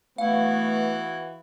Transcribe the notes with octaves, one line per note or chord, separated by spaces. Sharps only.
E3 A3 B3 E4 F#4 F5